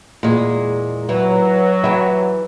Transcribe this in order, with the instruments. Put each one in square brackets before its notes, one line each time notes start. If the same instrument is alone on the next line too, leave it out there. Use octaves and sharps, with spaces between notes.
[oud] E2 G#3 [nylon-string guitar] A#2
[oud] E3 [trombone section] F#3
[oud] E3 G4 [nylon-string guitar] E5